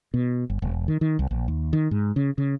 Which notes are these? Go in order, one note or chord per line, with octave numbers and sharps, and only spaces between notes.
B2
G1
E1
D#3
D#3
C2
A#1
D#2
D#3
G#2
C#3
C#3